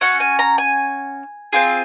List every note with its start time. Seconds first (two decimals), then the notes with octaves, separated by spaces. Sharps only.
0.01 C#4 F#4 F#5
0.20 G#5
0.39 A#5
0.58 G#5
1.53 C4 F4 G#4